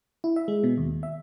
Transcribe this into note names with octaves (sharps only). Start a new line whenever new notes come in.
E4
E5
G#3
B2
D#2
E5